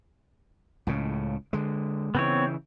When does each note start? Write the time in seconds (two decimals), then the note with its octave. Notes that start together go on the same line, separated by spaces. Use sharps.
0.87 C#2 A2 C#3
1.53 D3 G#3
2.15 C#3 E3 B3 C4 C#5